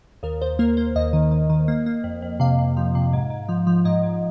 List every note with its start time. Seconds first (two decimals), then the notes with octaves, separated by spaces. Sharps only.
0.23 D#2 A#4
0.41 D#2 C5
0.59 A#3 A#4
0.77 A#3 C5
0.96 D#2 D#5
1.13 D#3
1.31 D#3
1.50 D#3
1.68 A#3
1.86 A#3
2.04 F2
2.22 F2
2.40 C3 F5
2.59 C3
2.77 F3
2.95 C3
3.13 G#2
3.30 G#2
3.49 F3
3.67 F3
3.85 G#2 D#5
4.03 G#2